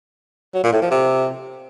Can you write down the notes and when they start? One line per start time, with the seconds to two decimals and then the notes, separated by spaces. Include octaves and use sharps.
0.55 F#3
0.64 A#2
0.73 A2
0.82 F3
0.91 C3